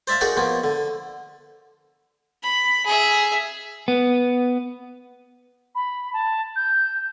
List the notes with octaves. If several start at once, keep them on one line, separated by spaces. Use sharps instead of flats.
C5 D5 E5 F5 A5
D#4 F#4 G#4 A#4 D5
B2 F3 A#3
D3
B5
G#4 E5
B3
B5
A5
G6